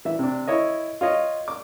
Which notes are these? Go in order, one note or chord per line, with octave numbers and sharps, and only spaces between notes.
E3 E5
C3 D4
E4 C#5 D#5
F4 C#5 D#5
D6